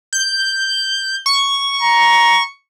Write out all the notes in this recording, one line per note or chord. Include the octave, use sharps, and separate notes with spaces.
G6
C#6
A#5